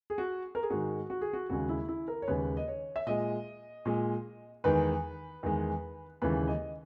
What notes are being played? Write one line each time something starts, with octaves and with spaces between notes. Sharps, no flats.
G#4
F#4
A#4
G#4
G#2 D#3 G#3 F#4
F#4
G#4
F#4
D#2 C#3 G#3 F#4
E4
E4
A#4
C#5
D#2 C#3 G#3 B4
D#5
C#5
E5
A#2 G#3 D#5
A#2 G#3
E2 D#3 G#3 B4
E2 D#3 G#3
D#2 C#3 E3 G#3 B4
D#5